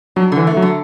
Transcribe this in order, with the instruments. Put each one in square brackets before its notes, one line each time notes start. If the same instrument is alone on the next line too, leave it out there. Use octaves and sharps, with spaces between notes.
[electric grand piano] F#3 [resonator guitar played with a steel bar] D4
[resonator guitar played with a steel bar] D3
[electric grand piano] E3
[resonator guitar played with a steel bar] A3
[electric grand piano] F#3
[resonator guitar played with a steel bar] D3